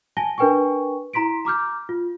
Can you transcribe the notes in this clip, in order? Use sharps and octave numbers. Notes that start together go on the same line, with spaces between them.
G#5 A5 A#6 G7
D4 A#4 B4 G5 G#5 C#6
E4 A#5 C6 B6 D7
A#5 D6 F6 G6
F4